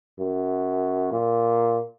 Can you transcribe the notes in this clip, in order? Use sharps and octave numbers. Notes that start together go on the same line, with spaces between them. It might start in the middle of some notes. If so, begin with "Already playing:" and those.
F#2
A#2